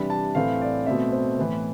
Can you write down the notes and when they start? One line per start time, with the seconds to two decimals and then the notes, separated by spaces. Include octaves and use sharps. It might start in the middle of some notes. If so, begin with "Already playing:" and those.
Already playing: C3 E3 G3 D4 B5
0.10 A5
0.35 A2 E3 A3 C4 F5
0.61 D5
0.86 B2 A3 C4 E5
1.12 C5
1.38 A2 E3 B3 B4